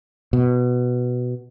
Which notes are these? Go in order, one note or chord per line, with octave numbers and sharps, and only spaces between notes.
B2